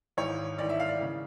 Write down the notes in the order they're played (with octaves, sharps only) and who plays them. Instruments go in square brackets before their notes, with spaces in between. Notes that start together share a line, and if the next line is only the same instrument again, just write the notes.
[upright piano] G#1 G#2 E3 C#5
G#1 G#2 E3 D5
E5
F5
D5
C#3 E3